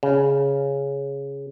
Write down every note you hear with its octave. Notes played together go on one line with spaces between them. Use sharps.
C#3